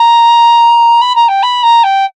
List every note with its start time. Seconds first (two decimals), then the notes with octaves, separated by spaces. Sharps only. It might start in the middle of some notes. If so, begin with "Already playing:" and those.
Already playing: A#5
1.01 B5
1.15 A#5
1.28 G5
1.42 B5
1.63 A#5
1.83 G5